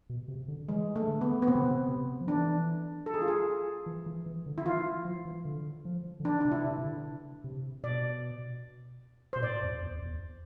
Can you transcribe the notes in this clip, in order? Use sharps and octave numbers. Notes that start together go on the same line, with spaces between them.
B2
C3
D3
E3 G#3
A3
D3
B3
B3
C3 C4
D3
C3
C3
F3
E3 D4
A4
G#4
F4
G#4
E3
E3
E3
D3
E4
E3 F4
F3
E3
D3
F3
D3
E3 D4
C3 D4
E4
C3
C3
D3
C3
B2 D5
B2 C5
A2 D5
F2
E2
E2